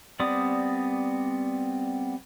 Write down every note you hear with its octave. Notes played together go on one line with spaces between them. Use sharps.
G3 B3 C4 D5 D#6